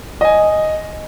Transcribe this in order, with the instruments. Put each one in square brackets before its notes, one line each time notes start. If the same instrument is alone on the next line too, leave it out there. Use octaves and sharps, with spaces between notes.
[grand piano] D#5 G#5